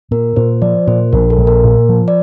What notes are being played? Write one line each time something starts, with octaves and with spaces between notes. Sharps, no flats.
A#2 A#4
A#2 C5
F3 D5
A#2 C5
A#1 A#4
A4
A#1
A#4
A#2
F3
D5